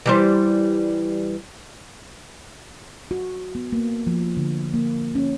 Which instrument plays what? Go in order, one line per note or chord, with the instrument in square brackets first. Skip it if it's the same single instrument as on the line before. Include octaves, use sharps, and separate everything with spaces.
[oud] E3 G3 C5
[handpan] F#4
B3
A#3
F3
D3
A#3
C#4